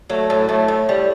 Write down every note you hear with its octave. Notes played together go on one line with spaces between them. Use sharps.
F#3 A3
A2
A2 A3
A2
G3